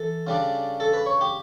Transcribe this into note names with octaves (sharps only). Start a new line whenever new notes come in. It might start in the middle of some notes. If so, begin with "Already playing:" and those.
Already playing: E3 A4
C#3 G3 D4
A4
B4
C#5
G4